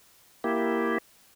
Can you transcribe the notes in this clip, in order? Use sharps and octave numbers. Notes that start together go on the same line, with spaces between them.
A#3 E4 G4